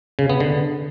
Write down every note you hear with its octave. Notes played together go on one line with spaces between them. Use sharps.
C#3
B3
D3